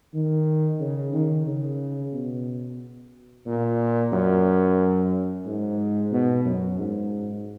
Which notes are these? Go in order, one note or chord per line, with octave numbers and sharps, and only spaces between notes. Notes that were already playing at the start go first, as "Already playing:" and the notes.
D#3
C#3
D#3
C#3
B2
A#2
F#2
G#2
B2
F#2
G#2